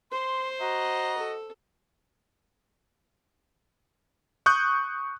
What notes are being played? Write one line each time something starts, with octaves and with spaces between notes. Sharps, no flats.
C5 C6
F#4 D#5 A#5
A4
C#6 D#6 F#6 G6